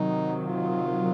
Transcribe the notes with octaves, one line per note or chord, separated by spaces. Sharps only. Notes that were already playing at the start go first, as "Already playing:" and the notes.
Already playing: C3 D#3 F#3 D#4
F4